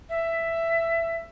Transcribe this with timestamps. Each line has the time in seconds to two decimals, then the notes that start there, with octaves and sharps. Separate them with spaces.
0.09 E5